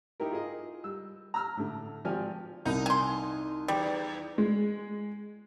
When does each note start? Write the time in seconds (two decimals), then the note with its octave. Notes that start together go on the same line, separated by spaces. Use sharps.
0.20 D#4 E4 G4 A#4
0.31 F4 G#4 D#5
0.84 G3 E6
1.34 A#5 E6 F6
1.57 A2 D3
2.05 G#1 F3 G4 D5 G#5 F6
2.65 C2 D#4
2.86 G#5 C6
3.68 E2 G3
4.38 G#3